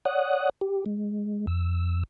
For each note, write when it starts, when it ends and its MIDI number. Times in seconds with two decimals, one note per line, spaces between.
0.05 0.49 73
0.05 0.49 74
0.05 0.49 78
0.05 0.49 87
0.05 0.49 90
0.61 0.85 67
0.86 1.46 56
1.47 2.03 41
1.47 2.03 88